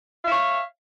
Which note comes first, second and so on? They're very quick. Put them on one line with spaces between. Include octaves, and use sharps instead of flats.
F5 E5 C#5